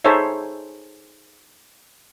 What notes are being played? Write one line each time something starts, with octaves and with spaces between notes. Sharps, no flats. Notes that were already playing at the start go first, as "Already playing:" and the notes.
D#4 G#4 A4 C5 C#5 E5